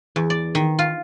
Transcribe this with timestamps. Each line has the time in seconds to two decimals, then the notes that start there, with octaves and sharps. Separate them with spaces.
0.16 E2
0.30 D5
0.55 D#3
0.79 F4